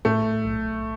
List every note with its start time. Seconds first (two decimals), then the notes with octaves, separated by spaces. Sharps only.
0.05 A2 A3
0.45 B1